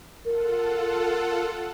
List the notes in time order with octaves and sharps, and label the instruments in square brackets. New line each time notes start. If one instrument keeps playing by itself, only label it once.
[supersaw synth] F4 A4 F#5 [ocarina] A#4